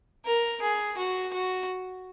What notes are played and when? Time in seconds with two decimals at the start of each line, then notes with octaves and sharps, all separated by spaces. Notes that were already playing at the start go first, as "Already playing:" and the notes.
0.25 A#4
0.62 G#4
0.98 F#4
1.33 F#4